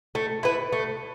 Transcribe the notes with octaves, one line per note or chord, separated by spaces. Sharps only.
A3
E4 B4
A3